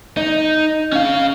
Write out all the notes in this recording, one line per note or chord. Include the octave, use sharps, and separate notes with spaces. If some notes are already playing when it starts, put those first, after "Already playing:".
D#4
C#4 F5